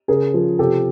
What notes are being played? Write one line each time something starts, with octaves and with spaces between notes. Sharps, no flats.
C#3 G#4 A#4
F3
C3 G4 A4